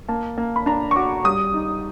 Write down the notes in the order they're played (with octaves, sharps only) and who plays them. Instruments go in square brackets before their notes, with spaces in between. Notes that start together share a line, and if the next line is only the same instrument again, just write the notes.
[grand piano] A#3 [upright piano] A5
[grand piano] A#3
[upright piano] B5
[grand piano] D4 [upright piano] A#5
[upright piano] C#6
[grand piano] F#4 [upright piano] D6
[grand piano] G3 [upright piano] D#6
[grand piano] D#4